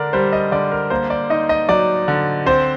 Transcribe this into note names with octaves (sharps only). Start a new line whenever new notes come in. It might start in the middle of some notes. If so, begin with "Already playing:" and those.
Already playing: D3 D4 A#4 D5
G3 C5
D#5
D3 D5
A#4
A#3 C5
D5
D#4 D#5
D#5
F#3 D5
D3
C4 C5